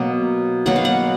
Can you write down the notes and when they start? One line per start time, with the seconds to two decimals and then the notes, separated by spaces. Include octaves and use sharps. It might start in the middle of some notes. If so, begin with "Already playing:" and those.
Already playing: B2 F#3 A#3 F#5
0.66 B2 F#3 A#3 F#5
0.76 F5
0.85 F#5